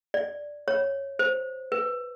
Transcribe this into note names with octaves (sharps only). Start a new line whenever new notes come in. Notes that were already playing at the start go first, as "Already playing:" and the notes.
D5
C#5
C5
B4